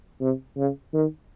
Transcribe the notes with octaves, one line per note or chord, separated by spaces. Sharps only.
C3
C#3
D#3